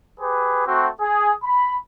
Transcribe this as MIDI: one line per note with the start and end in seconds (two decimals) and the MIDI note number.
0.19 0.62 67
0.19 0.62 68
0.19 0.62 71
0.66 0.87 57
0.66 0.87 60
0.66 0.87 66
1.00 1.32 68
1.43 1.77 83